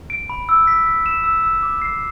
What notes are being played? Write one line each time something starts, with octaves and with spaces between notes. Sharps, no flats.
D7
B5
E6
B6
B6
E7
E6
E6
D6
C7